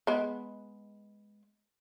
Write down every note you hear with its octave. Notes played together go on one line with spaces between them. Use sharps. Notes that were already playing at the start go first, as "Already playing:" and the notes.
G#3 B3